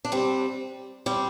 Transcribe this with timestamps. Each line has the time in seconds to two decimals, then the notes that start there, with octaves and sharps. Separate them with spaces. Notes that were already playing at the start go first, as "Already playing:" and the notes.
0.05 D4
0.12 G3 C4
1.06 G3 C4